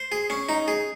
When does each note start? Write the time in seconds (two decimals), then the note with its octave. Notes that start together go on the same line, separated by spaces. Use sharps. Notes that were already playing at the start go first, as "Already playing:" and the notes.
Already playing: C5
0.12 G#4
0.30 C#4
0.49 D#4
0.68 G#4